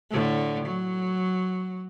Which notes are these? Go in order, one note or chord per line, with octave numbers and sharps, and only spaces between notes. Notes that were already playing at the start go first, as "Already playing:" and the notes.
A2 D3
F#3